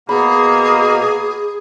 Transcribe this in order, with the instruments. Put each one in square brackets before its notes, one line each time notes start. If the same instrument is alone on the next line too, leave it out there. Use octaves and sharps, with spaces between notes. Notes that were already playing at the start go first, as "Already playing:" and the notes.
[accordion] B2 B3 [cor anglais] A#3 [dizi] G#4 [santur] B5